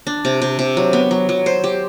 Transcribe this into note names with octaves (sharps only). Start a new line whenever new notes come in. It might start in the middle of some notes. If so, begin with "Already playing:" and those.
D4
C3
C3
C3
F#3
B3
F#3
F#3
C5
G4